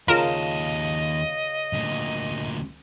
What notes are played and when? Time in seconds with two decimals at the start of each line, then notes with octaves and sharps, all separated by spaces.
0.08 D#2 C#3 F4 A#4 D#5 A5 E7
1.73 D2 A#2